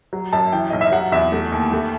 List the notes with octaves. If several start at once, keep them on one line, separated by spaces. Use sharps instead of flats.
F#3
F#2 A5
E3 G5
B1 D#5
E5
F#3 F#5
E2 E5
A3
D#2
A3